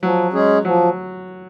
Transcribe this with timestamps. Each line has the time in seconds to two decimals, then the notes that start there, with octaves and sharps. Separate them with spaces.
0.03 F3 F#3
0.33 G#3 C#4 G#4
0.64 F3 F#3